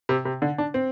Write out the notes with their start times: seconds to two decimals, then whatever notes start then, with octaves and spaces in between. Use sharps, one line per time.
0.09 C3
0.25 C3
0.42 D3
0.58 D4
0.74 C4